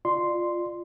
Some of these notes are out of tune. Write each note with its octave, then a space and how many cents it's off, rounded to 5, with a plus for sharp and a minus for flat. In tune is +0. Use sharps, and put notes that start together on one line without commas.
F4 +0 D5 +30 C6 -5